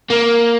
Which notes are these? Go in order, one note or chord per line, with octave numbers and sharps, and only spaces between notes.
A#3